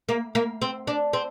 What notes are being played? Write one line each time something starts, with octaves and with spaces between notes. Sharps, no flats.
A#3
A#3
C4
D4
C4